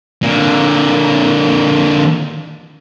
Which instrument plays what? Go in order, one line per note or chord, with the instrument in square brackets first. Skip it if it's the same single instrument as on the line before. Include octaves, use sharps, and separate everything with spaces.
[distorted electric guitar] A#2 D3